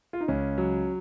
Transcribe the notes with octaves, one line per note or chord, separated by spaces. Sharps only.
F4
D#4
C#2 C#4
F#3